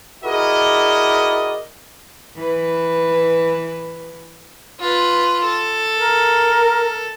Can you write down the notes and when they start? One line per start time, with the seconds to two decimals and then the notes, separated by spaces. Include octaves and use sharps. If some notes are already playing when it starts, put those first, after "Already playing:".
0.24 E4 F#4 G#4 A#4 D5 D#5
2.37 E3 B4
4.79 F4 B4
5.44 A4
5.99 A#4